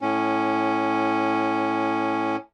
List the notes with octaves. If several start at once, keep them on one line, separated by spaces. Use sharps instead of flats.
A2 C#4